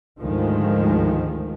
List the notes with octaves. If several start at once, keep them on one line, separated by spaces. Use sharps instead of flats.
D2 G#2 D#3 F3 G#3